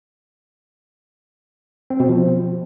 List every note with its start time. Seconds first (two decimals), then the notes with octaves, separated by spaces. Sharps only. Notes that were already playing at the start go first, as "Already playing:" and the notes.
1.90 C4
2.00 B2
2.09 F3